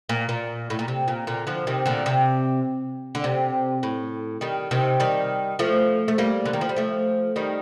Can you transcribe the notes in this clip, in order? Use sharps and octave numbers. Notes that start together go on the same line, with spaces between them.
A#2
A#2
A2
A#2
C3
A#2
A#2 D3
D3 F3
C3 D#3
A#2 D3
C3
D3
C3
A2
D#3 G3
C3 D#3
D#3 G3
F3 A3
A3
G3 A#3
D3
D#3
F3
G3
F3 A3
D#3 G3